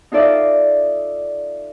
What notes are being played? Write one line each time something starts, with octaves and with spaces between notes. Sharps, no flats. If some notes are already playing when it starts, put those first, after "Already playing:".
D#4 F4 A4 D5 E5